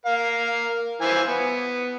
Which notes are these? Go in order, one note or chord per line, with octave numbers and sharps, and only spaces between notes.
A#4 F5
E3 C5 G#5
B3